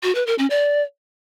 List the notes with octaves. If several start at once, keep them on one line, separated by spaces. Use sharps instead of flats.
F#4
B4
A#4
C#4
D5